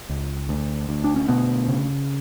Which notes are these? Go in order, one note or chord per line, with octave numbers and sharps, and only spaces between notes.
C#2
D2
D2
D4
C#4
D2 B2 B3
C#3